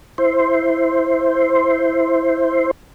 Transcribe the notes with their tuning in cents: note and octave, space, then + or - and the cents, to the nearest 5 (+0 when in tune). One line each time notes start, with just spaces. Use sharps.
E4 +5 C5 +0